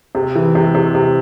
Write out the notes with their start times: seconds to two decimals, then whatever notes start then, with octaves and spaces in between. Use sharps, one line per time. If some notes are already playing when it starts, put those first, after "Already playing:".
0.15 C3
0.35 E3
0.55 C3
0.75 C3
0.95 C3